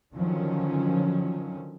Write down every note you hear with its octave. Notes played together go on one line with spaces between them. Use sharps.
D3 D#3 F3 F#3 C#4